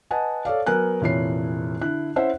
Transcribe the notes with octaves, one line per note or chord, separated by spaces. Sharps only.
B4 D#5 F#5 G#5 A5
A4 C#5 D5 F5
F#3 B3 A#4 G#5 F#6
F1 A#2 E3 E4 C#5 C7
D3 E4 F#6
C#4 E4 C5 E5 F#5